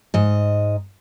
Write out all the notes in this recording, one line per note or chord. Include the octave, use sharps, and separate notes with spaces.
G#2 D#5